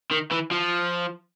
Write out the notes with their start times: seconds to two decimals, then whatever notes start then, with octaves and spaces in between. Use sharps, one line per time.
0.11 D#3
0.32 E3
0.51 F3